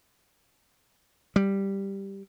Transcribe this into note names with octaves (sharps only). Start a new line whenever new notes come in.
G3